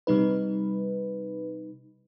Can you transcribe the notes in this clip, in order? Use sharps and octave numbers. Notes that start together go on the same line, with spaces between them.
C3 G3 D#4 B4